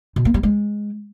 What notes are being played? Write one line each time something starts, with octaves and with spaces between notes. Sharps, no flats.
B2
A#3
G3
G#3